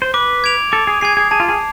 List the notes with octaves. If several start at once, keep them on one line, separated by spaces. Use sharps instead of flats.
C5
B4 D6
G#6 D7 F7
A4 D6
G#4
G#4 G#6 C7
G#4
G#4 A5
F4
G#4